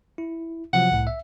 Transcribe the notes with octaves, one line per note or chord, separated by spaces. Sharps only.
E4
C3 F3 F#3 F#5
C2 A2
E5